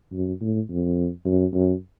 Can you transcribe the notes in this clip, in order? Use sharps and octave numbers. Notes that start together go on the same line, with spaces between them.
F#2
A2
F2
F#2
F#2